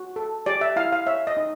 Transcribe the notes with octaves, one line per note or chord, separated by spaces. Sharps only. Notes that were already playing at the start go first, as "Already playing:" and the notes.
Already playing: F#4
A4
G4 D5
E5
E4 F5
F5
C#5 E5
D#5
D#4